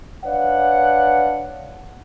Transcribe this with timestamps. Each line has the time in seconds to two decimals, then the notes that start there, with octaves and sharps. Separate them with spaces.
0.24 D4 B4 C#5 D5 F5 F#5